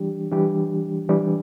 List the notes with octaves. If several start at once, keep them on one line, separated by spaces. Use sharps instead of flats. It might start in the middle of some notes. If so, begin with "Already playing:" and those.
Already playing: E3 G3 D4 G4
E3 G3 D4 G4
E3 G3 D4 G4